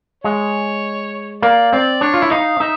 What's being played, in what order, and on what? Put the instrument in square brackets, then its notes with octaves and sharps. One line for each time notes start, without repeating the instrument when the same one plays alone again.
[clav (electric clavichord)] G#3 [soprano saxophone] C#5
[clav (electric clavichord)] A#3 [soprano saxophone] D5
[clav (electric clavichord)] C4 [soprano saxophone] D5
[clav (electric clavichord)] D4 [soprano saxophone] C#5
[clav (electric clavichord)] F4
E4
[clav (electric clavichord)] D#4 [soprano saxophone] F5
[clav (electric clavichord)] D#4 [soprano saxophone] E5